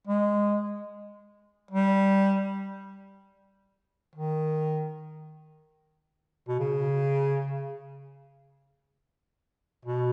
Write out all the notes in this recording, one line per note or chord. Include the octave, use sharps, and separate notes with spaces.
G#3
G3
D#3
B2
C#3
B2